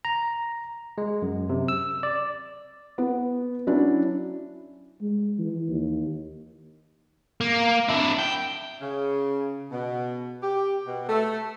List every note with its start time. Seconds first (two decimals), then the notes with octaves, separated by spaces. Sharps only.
0.05 A#5
0.98 G#3
1.22 F#2
1.49 C3
1.68 E6
2.03 D5
2.98 B3
3.67 F#3 C#4 D4 E4
5.01 G#3
5.39 E3
5.68 D#2
7.41 A#3
7.89 D4 E4
8.19 G5
8.80 C#3
9.71 B2
10.42 G4
10.86 B2
11.08 A3